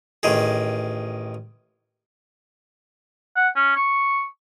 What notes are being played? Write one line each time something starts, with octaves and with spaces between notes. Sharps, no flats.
A1 D#3 G#4
F#5
C#4
C#6